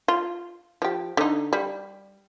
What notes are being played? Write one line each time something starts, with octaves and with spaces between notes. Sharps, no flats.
F4
F3 G4
D3 D#4
G3